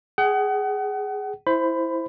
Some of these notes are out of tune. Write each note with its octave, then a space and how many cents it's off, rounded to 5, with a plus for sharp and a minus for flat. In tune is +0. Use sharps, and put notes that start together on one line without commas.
G#4 +0 F#5 +35
E4 +0 C5 +0 B5 +20